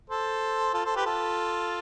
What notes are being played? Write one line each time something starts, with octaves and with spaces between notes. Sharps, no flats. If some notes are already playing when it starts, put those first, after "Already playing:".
A4 C5
F4 A4
A4 C5
G4 B4
F4 A4